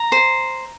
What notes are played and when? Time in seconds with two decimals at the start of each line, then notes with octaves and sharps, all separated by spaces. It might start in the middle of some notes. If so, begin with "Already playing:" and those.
Already playing: A#5
0.12 C5